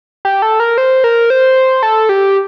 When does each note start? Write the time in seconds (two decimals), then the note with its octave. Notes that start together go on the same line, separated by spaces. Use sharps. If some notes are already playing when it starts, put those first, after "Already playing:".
0.25 G4
0.42 A4
0.60 A#4
0.78 C5
1.04 A#4
1.30 C5
1.83 A4
2.09 G4